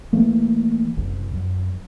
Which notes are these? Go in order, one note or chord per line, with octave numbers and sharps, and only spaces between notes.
E3 A3 A#3
F#1 C2
F#2